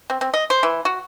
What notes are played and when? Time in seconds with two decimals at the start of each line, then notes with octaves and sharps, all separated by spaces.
0.10 C4
0.21 C4
0.34 D#5
0.50 C5
0.63 E3
0.85 F#4